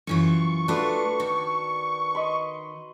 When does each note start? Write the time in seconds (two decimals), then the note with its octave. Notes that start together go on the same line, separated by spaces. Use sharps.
0.07 F#2 E3 F4 C#6
0.68 A3 D4 F4 F#4 B4
1.20 D#3
2.15 D#5 B5 C6